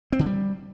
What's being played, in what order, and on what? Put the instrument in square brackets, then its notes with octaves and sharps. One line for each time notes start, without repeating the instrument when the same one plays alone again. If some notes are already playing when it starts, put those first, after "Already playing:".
[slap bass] C4
D3
G3